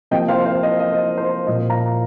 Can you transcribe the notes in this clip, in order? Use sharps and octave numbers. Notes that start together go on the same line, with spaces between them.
C3 F3 A#3 D#5 G5
C5 F5
C5 F5
D#5
D#5
C5
C5
A#2 F3 A#3 D#5
F5 A#5